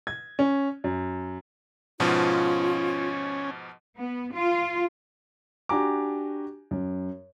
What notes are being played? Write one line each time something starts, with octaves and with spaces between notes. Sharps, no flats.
G#6
C#4
F#2
G#2 B2 F3 C#4 F4
B3
F4
D4 F#4 G4 G#5 A#5 D6
F#2